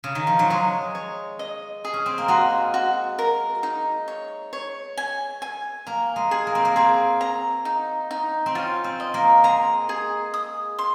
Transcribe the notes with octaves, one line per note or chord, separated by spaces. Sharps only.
C#3
D#3
F3
F#3
G#3 C#5
C#5
D#5
G#4
C#4
C4
A#3
G#3 F#4
F#4
A#4
D#4
C#5
C#5
G#5
G#5
A#3 A#5
G#3
G#4
A#3
C4
A#3
C4 G#4
A#5
D#4
D#4
C4
C#4 F4
C4
D#5
A#3
G#3 A#5
G#4
D#6
C6